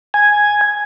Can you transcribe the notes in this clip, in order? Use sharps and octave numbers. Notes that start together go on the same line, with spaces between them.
G#5